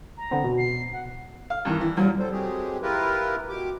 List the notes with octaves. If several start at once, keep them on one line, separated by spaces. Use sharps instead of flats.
A#5
D3 B3 C4
B2
C7
F#5
F5
G2 D#3 E3
E3
F#2 A#2 F3 G3
G3 A4 C5
F#3 G#3 A3 C4 G4 G#4
E4 F4 G4 A#4 B4
B2 G4 D6